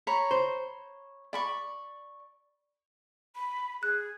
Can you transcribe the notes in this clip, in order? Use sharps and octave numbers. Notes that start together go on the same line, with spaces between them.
C#5 A#5 B5
C5
D5 B5 C#6
B5
G#4 F#6